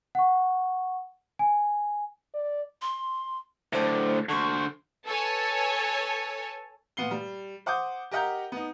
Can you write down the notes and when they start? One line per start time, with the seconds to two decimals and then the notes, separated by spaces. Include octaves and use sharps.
0.15 F#5 C#6
1.39 G#5
2.34 D5
2.82 C6
3.73 A2 D3 C5
4.29 D3 C5 C#6
5.07 A4 B4 C#5 G#5 A5
6.97 A#2 B3 C7 G7
7.11 G3
7.66 C5 F#5 D6 D#6 G6
8.12 G4 A#4 D#5 F#5 A#5 G6
8.52 B3 D#4